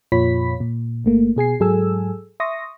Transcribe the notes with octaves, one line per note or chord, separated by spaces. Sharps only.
F2 A#2 F4 C#5 B5 B6
A#2
G1 A3 A#3
B2 G#4 G#5 C7
G#2 F#3 G#4 A4 G#5 E6
E5 C6 C#6 D#6 A#6